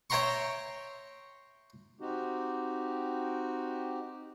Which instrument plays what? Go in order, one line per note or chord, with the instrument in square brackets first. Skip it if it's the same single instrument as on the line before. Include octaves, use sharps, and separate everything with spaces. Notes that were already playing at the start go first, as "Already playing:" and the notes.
[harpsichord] C#5 E5 G5 A#5 C6 C#6
[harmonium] C4 D#4 F#4 G4